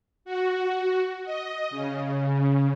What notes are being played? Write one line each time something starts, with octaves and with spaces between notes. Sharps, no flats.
F#4
D#5
C#3